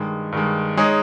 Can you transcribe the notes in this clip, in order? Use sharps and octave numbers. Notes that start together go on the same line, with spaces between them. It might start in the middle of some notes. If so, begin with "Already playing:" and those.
Already playing: G2 D#3 G#3
G2 D#3 G#3
G#3 D#4 G#4 C#5